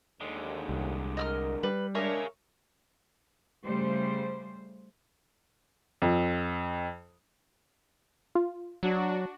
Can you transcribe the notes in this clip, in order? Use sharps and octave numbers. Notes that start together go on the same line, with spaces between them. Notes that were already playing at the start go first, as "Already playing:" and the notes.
D#2 D3 G#3
C2
A#4 D#5 E6 F6
G3 B4
G#3 D4 G#4 A#4 C#5 E5 F5
C#3 G3 A3 C5
F2
F4
F#3 D4 F#4